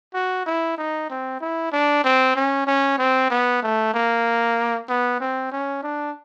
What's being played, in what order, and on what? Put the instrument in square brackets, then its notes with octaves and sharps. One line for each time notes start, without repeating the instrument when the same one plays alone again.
[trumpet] F#4
E4
D#4
C4
E4
D4
C4
C#4
C#4
C4
B3
A3
A#3
B3
C4
C#4
D4